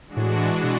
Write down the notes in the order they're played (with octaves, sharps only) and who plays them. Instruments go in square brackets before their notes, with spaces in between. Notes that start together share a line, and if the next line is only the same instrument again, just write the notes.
[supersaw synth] E3 G#3 D4 F#4
[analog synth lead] A2
B2